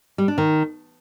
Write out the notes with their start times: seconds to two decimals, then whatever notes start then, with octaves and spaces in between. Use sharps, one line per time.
0.18 G3
0.28 D4
0.38 D#3